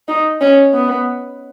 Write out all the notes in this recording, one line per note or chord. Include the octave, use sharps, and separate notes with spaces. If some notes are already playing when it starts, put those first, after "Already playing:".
D#4
C#4
B3